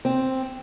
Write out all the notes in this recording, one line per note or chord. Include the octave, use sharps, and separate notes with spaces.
C4